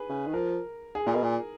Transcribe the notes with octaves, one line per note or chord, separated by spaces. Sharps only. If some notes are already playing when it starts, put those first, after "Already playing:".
Already playing: G#4 B4
C#3
D#3
F3 A#4
G#4
A#2 A#4
B2
A#2